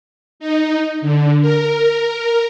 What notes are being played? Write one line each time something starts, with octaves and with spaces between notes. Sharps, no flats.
D#4
D3
A#4